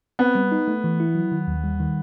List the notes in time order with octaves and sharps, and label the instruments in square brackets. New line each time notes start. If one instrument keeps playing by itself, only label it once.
[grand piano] B3 [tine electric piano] C4
[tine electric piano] G3
D#4
A3
E3
E4
F#3
D#3
D#2
G3
D#3